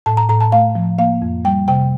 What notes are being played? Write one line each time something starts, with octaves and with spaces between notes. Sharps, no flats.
A2 A5
A#5
A2 A#5
A5
A3 F5
F3
A#3 F5
F2
G3 G5
C3 G5